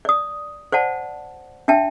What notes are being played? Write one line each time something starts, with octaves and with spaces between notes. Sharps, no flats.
D5 D#6
C5 D5 F#5 A5
D4 E5 G5 A5